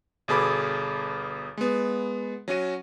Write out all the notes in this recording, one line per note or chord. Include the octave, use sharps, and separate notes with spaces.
G1 B2 G#4 A4 B5 D6
G#3 B3
F#3 C#4 F#4 D#7